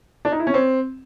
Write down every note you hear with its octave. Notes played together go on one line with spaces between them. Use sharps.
D4
D#4
E4
C#4
C4